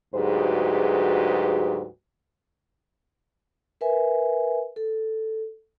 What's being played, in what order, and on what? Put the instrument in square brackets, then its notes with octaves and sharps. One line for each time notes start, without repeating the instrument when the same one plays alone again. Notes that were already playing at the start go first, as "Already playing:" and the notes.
[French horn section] D2 G#2 F#3 G4 G#4 B4
[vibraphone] A#4 B4 E5 G#5
A4